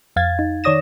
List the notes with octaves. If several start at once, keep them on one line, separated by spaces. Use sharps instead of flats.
F2 F5 G#6 A6
D#4
D#3 C#5 D5 D#6 A#6 E7